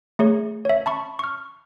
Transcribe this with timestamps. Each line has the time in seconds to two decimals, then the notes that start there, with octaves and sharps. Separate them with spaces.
0.19 A3 G#4 C#5
0.65 C#5 E5
0.86 A5 B5 C#6
1.19 C#6 F6